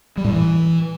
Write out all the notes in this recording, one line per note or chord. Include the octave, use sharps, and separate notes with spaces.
G3
A2
E3